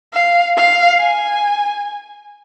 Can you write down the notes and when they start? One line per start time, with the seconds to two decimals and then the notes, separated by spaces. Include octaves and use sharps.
0.13 F5
0.57 F5
0.99 G#5